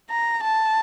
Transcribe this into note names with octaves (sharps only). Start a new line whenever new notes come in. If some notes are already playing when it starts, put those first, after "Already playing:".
A#5
A5